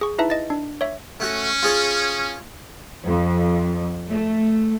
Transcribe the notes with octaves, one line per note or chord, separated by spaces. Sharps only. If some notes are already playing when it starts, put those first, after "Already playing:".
G#4 C#6
D#4 E4 B4 E5 A5
D#5 A6
D4
C#5 E5
A3 C#4 F#4
F4 G#4 C#5
F2
A3